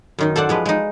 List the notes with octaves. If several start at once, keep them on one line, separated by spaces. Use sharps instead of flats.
F#2 D#3 D#4
A4 C5 D5 F#5
F3 G#3 B4
G#3 D#4